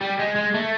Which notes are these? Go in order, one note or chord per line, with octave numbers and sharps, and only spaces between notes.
G3
G#3
G#3
A3